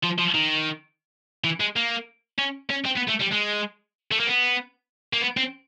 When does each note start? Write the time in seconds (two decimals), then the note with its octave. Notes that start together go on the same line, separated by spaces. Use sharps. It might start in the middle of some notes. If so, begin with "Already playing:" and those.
0.03 F3
0.18 F3
0.34 D#3
1.44 E3
1.60 G#3
1.76 A#3
2.39 C#4
2.70 C#4
2.86 C4
2.97 B3
3.09 A3
3.21 G3
3.33 G#3
4.11 A3
4.20 A#3
4.27 B3
5.13 A#3
5.21 B3
5.37 C4